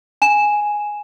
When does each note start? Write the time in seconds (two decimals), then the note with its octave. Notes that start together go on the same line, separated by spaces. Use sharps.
0.22 G#5 E7